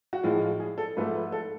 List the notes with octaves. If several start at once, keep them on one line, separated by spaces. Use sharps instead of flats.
F#4
A2 F3 G#3 F4
F4
G#4
A4
G#2 F3 A3 B4
B4
A4